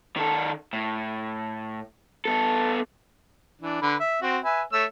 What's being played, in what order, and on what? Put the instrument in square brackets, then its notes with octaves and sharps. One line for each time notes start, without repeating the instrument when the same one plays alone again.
[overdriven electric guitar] D#3 A4
A2
B3 A4
[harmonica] E3 D4
D3 B4
E5
C4 F#4
B4 E5 G#5
A3 C#5 E6